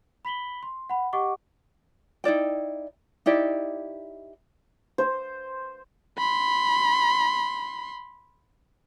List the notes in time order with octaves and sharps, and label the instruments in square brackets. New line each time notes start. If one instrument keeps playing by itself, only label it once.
[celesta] B5 B6 F#7 G7
C6
F#5 B5
G4 D#5 F#5 C#6 D6
[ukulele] D#4 E4 D5 G5
D#4 E4 G4 D5
[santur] C5
[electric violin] B5 C6